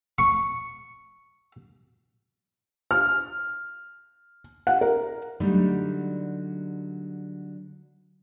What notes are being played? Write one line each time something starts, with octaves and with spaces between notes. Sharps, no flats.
C#6
F6
F#5
A#4
D3 F#3 G3 A3 D#4